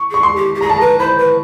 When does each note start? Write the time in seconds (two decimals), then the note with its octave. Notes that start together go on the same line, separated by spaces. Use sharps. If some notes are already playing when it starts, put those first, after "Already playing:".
Already playing: C#6
0.11 G#4 C#6
0.23 C6
0.36 G4
0.55 G4
0.61 G#4 A#5
0.70 A5
0.77 B4 A#5
0.99 C5 B5
1.19 B4